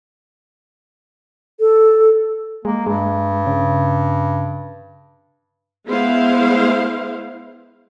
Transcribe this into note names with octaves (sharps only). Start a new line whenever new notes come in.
A4
G#3 A#3
G2 G#3
C#3
G#3 B3 E4 C5 F5